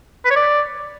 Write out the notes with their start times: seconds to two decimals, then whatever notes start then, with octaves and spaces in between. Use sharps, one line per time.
0.25 B4
0.30 C#5
0.36 D5